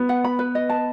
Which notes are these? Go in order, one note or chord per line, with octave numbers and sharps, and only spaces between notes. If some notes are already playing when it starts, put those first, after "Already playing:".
Already playing: B3
F#5
B5
B4
D#5
A5